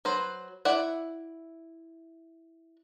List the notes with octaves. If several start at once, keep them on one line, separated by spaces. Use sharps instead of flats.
F#3 B4 C5
E4 D5 E5 F#5